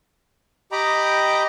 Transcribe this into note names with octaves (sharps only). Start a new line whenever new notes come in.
G4 D#5 G5 A#5 B5 D6